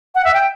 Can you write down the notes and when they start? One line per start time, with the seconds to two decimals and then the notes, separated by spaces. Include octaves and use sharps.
0.15 F#5
0.24 E5
0.34 G5